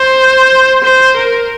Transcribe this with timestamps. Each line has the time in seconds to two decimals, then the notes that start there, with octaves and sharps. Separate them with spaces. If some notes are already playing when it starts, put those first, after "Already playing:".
Already playing: C5
0.83 C5
1.17 A#4